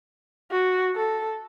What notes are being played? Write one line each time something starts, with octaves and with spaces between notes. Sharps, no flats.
F#4
A4